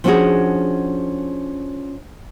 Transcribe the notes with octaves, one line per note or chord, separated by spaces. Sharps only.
F3 B3 C#4 D4 F#4 G#4